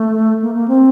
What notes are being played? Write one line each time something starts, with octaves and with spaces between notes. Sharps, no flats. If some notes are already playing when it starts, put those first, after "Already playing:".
Already playing: A3
A#3
A#3
C4